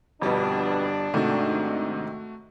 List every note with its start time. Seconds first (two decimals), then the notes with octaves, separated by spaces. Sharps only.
0.22 G1 F2 B2 G3 D4
1.14 G#2 C3 D#3 A3 F#4